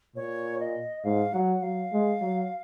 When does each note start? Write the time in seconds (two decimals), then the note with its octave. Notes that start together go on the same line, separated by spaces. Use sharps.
0.16 A#2 C#5
0.60 D#5
1.04 G#2 F5
1.34 F#3 F#5
1.62 F#3 F5
1.93 G#3
2.21 F#3